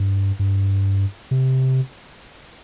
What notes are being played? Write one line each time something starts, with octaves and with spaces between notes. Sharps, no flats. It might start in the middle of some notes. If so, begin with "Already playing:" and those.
Already playing: G2
G2
C3